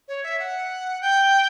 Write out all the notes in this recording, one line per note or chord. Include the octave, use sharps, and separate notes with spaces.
C#5
E5
F#5
G5